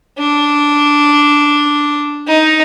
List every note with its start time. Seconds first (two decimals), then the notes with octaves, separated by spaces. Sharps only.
0.18 D4
2.27 D#4